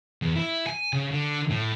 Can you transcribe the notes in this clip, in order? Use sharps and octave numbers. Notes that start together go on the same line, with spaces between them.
E2
E4
G#5
C#3
D3
A2